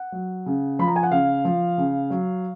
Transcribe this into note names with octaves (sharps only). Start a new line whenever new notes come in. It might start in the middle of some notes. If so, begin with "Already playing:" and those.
Already playing: F#5
F#3
C#3
F3 B5
A#5
G#5
F#5
C#3 F5
F3
C#3
F#3